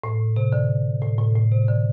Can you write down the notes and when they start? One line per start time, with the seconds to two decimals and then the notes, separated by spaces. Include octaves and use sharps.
0.04 A2
0.36 C3
0.52 D3
1.02 A2
1.19 A2
1.36 A2
1.51 C3
1.68 D3